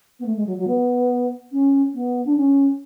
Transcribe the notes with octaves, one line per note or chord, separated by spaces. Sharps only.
B3
A3
G#3
F#3
F#3
B3
C#4
B3
D4
C#4